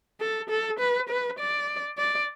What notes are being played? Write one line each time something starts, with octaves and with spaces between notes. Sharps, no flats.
A4
A4
B4
B4
D5
D5